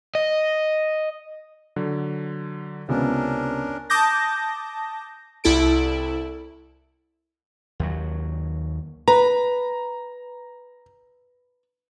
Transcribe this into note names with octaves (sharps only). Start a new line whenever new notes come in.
D#5
D3 F#3
C#2 C3 B3 C#4 D4 A#4
A5 D6 D#6 G6 A#6
C2 E4 A4 D7
D#2 F#3
B4 A#5